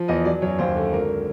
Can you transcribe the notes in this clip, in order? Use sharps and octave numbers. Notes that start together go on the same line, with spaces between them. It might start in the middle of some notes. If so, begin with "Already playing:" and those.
Already playing: F3
E2 D#5
F#3 D5
F#2 C#5
D#2 C5
D3
G#1 A#4